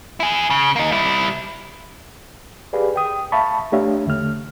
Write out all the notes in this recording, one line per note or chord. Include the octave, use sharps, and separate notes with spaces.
E4 G#4
C#3
A#3 D#4
G3 E4
G4 G#4 B4 D5 F5
G5 D#6
E5 F5 A5 B5 C#6
A3 D4 G4 C#5 E5 F5
E2 D3 A3 F6